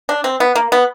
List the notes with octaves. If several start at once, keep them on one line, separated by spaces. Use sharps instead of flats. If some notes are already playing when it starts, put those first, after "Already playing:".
D4
C4
B3
A#3
B3